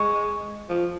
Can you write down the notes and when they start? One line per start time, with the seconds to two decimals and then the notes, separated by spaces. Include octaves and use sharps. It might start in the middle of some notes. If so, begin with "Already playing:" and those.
Already playing: G#3 C#6
0.69 F3